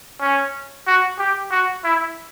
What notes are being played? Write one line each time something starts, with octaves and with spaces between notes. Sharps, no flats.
C#4
F#4
G4
F#4
E4